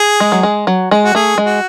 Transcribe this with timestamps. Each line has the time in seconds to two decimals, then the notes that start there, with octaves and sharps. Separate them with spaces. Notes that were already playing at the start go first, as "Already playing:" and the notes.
Already playing: G#4
0.20 G#3
0.32 F#3
0.43 G#3
0.67 F#3
0.91 G#3
1.05 F#4
1.15 A3 G#4
1.38 G#3
1.46 F#4